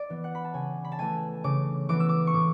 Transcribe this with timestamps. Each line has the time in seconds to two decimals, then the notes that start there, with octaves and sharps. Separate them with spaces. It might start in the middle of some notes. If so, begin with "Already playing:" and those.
Already playing: D5
0.10 E3 B3
0.24 F#5
0.35 B5
0.44 A5
0.54 C#3 G#5
0.85 B5
0.92 A5
0.99 E3 A3 G#5
1.44 C#3 D6
1.89 E3 B3 D6
2.00 E6
2.09 D6
2.27 C#6
2.33 A2 D6